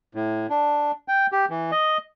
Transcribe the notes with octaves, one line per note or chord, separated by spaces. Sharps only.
A2
D4
G5
G4
E3
D#5